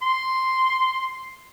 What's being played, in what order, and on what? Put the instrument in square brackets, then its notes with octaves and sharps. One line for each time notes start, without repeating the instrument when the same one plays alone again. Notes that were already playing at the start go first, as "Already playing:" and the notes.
[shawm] C6